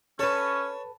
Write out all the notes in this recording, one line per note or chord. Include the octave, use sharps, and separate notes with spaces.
C#4 A4 B4 C#5 A5